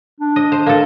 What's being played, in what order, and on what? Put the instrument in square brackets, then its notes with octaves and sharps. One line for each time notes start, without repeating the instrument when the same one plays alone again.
[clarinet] D4
[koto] D#5
C5
A#3 A4